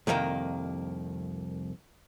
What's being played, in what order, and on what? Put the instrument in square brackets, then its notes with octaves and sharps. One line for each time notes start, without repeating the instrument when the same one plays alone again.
[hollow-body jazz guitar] C2 F2 D#3 A#3